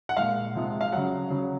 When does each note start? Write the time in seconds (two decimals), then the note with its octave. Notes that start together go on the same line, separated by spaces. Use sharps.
0.09 F#5
0.17 A#2 G#3 F5
0.55 C3 F3 G#3
0.81 F5
0.92 C#3 F#3 F#5
1.30 C#3 F#3